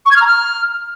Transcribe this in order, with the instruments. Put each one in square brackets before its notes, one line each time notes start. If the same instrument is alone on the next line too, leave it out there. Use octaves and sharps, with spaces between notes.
[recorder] C#6
G#6
F6
A#5
F6